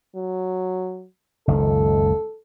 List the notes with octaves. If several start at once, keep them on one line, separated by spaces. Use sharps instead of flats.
F#3
F#1 C#2 D#3 A4